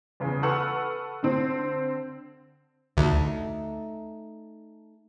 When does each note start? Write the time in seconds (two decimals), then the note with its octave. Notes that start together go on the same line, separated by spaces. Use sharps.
0.20 E2 C#3
0.42 A4 B4 F#5 C#6 E6 F6
1.23 D3 C4
2.97 D2 A3 D#4 A4